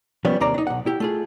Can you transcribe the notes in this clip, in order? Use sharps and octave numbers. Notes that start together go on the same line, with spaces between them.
F3 G3 A#3 B3 C#4
D#2 C3 A#3 D5 A#5
D4 D#4
B1 F#5
E4 G4
A3 F4 G#4